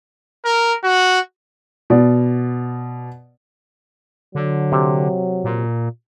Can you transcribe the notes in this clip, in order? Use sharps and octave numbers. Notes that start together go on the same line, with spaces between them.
A#4
F#4
B2 D5
D3 F#3
C3
A#2